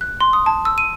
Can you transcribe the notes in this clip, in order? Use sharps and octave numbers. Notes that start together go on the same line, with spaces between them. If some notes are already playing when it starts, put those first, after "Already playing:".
F#6
C6
D#6
A5
E6
D#7